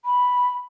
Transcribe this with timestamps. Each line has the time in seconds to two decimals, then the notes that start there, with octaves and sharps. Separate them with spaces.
0.05 B5